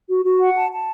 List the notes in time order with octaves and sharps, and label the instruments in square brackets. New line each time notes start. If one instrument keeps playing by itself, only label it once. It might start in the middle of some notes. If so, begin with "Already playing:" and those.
[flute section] F#4
F#4
F#5
A5
A5